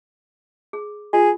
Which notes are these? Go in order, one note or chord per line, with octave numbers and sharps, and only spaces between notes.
G#4
F4 G#4